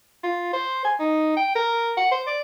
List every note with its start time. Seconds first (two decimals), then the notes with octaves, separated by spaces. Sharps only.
0.23 F4
0.53 C5
0.84 G#5
0.99 D#4
1.36 G5
1.55 A#4
1.97 F#5
2.11 C5
2.27 D5